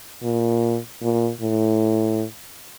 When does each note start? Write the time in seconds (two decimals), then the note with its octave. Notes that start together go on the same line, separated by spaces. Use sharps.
0.23 A#2
1.02 A#2
1.41 A2